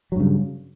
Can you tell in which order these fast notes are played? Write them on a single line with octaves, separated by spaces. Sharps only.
F#3 G2 C#3